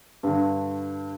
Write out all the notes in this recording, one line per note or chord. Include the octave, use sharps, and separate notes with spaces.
G2 D3